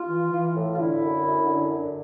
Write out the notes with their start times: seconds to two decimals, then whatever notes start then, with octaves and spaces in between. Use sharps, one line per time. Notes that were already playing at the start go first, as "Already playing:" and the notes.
Already playing: F4
0.08 E3
0.31 E3
0.55 A2
0.74 F4
0.78 D3 E4
1.01 F#2
1.25 F#2
1.47 D3
1.70 D3